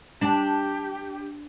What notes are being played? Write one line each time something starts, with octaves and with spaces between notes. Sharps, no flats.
D4 G4